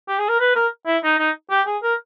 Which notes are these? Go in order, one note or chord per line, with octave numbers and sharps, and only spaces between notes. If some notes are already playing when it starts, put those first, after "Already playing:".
G4
G#4
A#4
B4
A#4
E4
D#4
D#4
G4
G#4
A#4